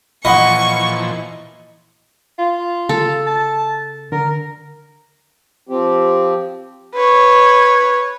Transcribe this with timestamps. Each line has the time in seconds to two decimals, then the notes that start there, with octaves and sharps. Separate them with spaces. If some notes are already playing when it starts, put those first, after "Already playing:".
0.25 A#2 E3 F3 D#5 F#5 B5 C#6
2.38 F4
2.89 C#3 A4
3.27 A5
4.12 D3 A#4
5.69 F3 C4 G4
6.94 B4 C#5